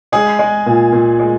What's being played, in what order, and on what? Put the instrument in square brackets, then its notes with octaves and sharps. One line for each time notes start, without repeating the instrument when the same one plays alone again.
[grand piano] G#3 G#4
G#3
A#2
A#2
G#3